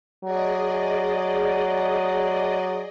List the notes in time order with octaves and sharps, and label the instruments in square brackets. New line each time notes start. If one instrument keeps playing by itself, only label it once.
[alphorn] F#3 [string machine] G#4 D5 D#5